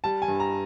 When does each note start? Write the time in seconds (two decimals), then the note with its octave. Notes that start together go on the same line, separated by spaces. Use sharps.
0.04 G3 A5
0.22 G#5
0.28 G2
0.40 A#5